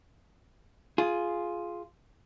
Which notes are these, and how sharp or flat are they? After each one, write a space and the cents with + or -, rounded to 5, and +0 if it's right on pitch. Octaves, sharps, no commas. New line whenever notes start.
F4 +0 G#4 +10